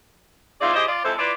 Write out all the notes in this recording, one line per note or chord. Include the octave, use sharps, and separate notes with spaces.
G#2 C4 E4 F4 G#4 D5
E4 F4 G4 G#4 C5 D#5
F4 D5
F2 G#3 E4 A4 C5
E4 F4 B4 D5